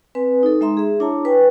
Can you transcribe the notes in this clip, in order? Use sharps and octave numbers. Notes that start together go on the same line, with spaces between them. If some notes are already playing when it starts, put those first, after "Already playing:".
C4 B4 G#5
D#4 A4
G#3 D#4 E5 A#5 C6
G#4 E5
D4 E4 C#5 A5 A#5
B4 G5 G#5 C#6